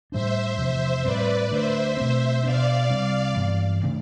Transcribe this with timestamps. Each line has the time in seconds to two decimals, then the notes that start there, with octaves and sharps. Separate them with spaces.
0.11 A2 G3 D4 C5 E5
0.58 E2 C3 F3 C5 E5
1.04 A2 G3 C4 B4 D5
1.51 D3 A3 D4 C5 E5
1.97 B2 A3 C4
2.43 B2 B3 D4 D5 F5
2.90 C3 G3 C4
3.36 G2 E3 B3
3.83 C3 E3 A3 D4